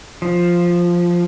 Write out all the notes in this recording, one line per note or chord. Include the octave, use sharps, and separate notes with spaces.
F3